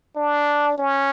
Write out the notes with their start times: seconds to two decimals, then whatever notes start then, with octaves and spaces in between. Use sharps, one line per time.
0.16 D4
0.78 C#4